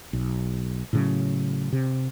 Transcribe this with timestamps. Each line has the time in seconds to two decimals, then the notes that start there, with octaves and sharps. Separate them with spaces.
0.13 B1
0.93 A2 C#3 F#3
1.73 C3